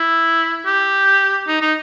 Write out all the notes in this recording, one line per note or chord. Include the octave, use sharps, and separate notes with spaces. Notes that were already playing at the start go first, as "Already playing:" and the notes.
Already playing: E4
G4
D#4
D#4